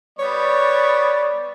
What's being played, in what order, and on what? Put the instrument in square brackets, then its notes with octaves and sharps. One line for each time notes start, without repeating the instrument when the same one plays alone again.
[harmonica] G3 B3 C#6 [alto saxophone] C#5 [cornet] D5